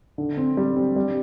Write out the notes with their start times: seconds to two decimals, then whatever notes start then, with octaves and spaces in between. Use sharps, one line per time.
0.18 D3
0.37 C4
0.57 G3
0.76 C4
0.96 G3